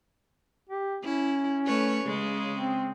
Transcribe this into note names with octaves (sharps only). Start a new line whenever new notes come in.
G4
C#4 E4
A3 B4 C#5
C#3 G#3
C4